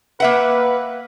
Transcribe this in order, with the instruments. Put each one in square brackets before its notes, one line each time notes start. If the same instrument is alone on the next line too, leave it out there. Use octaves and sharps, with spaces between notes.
[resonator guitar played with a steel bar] A#3 E5 F#5 [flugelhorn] B4